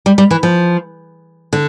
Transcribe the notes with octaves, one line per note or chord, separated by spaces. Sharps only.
G3
G3
E3
F3
D3